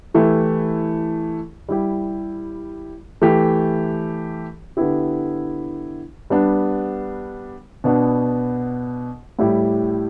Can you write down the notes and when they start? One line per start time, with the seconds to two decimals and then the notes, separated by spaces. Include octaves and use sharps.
0.14 E3 A3 E4 G4
1.69 G3 E4 G4
3.22 E3 A3 G4
4.77 D3 B3 E4 G4
6.30 G3 B3 D4
7.84 B2 B3 D4
9.39 A2 G3 E4 G4